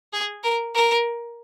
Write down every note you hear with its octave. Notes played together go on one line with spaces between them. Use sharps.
G#4
A#4
A#4